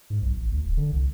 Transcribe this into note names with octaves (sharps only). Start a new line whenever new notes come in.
G#2
B1
A1
D2
D1
D3
C2